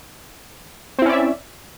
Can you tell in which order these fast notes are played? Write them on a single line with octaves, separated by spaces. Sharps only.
C4 E4 C#4 D5 E5